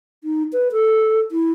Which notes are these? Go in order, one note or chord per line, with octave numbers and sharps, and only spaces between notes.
D#4
B4
A4
E4